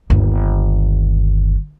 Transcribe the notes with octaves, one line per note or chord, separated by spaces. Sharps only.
G1 D#2